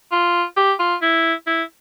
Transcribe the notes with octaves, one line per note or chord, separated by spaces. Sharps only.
F4
G4
F4
E4
E4